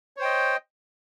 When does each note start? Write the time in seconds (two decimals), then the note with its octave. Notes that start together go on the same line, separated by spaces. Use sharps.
0.17 C#5
0.19 C5
0.22 G5
0.24 D#5